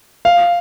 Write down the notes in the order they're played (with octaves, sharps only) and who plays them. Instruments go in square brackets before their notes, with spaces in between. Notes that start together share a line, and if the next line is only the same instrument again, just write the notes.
[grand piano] F5